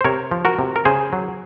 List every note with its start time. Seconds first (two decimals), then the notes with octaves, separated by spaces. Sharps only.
0.01 C5
0.04 C3 A#4 C#5
0.31 F3
0.45 F#4 A#4
0.59 C3
0.76 A#4
0.85 C#3 G#4 C5
1.13 F#3